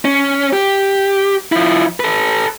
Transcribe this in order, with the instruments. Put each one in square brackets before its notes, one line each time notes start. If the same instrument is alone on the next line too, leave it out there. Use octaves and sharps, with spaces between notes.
[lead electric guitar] C#4
G4
F3 E4
A4 B4